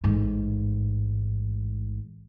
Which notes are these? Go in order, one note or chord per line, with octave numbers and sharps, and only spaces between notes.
A1 G#2